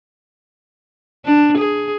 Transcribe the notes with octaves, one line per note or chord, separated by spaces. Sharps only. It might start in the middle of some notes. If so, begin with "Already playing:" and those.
D4
G#4